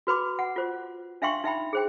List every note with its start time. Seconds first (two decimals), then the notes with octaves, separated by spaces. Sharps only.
0.07 F#4 B4 B5 D6
0.39 F#5
0.56 F4 C5
1.22 D4 E5 F5 G5 C6 C#6
1.44 D#4 E5 G5 B5
1.73 G#4 C5 G5